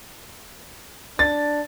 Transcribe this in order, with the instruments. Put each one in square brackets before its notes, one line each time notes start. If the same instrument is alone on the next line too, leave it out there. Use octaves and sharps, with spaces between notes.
[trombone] D4 [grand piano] A6